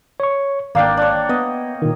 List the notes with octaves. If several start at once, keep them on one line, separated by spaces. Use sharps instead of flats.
C#5 C#6
G#1 A#3 D4 F5 G5
D4 C#5
B3 D#5
A#2 D#3